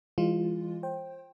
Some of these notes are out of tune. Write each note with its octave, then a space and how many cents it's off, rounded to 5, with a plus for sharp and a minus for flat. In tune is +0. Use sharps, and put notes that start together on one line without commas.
E3 +15 G#3 -30 F4 +0
C5 +30 G5 +0